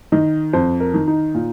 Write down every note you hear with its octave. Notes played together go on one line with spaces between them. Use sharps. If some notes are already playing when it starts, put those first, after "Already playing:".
D#3 D#5
F2 C5
A#4
D#3
D#4
A#2